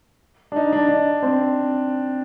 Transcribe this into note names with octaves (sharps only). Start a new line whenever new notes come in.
D4
D#4
D4
D4
C4